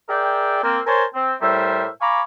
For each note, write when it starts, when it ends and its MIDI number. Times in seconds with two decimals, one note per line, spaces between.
0.09 0.59 68
0.09 0.59 70
0.09 0.59 74
0.09 0.59 76
0.09 0.59 79
0.63 0.80 58
0.63 0.80 60
0.87 1.04 70
0.87 1.04 72
0.87 1.04 73
0.87 1.04 80
0.87 1.04 81
0.87 1.04 84
1.15 1.35 60
1.41 1.87 45
1.41 1.87 55
1.41 1.87 70
1.41 1.87 72
1.41 1.87 76
2.01 2.22 77
2.01 2.22 80
2.01 2.22 82
2.01 2.22 83
2.01 2.22 85
2.01 2.22 86